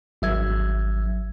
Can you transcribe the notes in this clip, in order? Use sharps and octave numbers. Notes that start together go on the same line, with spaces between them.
G#1 F#3 E5 E6 G#6